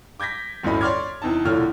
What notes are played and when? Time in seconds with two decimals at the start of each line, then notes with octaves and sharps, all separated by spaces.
0.20 D6 G6 G#6 A#6 B6
0.63 G1 D2 A2 C#4 D#5 B5
0.81 C#5 D5 C6 D6 F6 G#6
1.22 E2 C3 D#4 A5
1.45 E1 A#2 D3 E4 C#5 F6